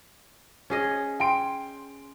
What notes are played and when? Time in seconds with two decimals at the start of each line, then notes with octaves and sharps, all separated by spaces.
0.70 C#4 G#4 D#5
1.20 G5 C6 D7